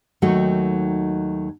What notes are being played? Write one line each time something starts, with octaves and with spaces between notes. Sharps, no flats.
D#2 D#3 F#3 A3 F#4